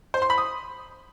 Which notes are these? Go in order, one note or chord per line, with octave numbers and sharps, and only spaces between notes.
C5
C6
B5
D#6